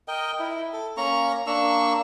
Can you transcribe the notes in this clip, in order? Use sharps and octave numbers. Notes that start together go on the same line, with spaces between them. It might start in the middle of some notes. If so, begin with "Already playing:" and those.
A#4 D#5 G5
E4
A4
A#3 C#4 A#5 C#6
A#3 D4 C#6 E6